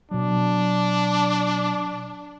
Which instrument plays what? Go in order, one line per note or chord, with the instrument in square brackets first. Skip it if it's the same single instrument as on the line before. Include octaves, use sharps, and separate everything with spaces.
[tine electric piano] B2 F#3 [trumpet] D4